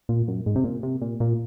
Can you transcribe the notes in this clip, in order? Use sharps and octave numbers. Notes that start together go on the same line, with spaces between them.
A#2
F#2
G#2
C3
A#2
C3
A#2
A#2